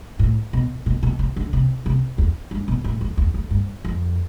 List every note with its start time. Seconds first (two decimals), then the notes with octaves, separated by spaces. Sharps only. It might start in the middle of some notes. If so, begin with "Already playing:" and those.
0.19 A2
0.53 B2
0.86 B2
1.03 B2
1.19 C3
1.36 D3
1.53 C3
1.86 C3
2.18 E2
2.51 G2
2.68 B2
2.84 A2
3.01 F2
3.17 E2
3.34 F2
3.51 G2
3.85 F2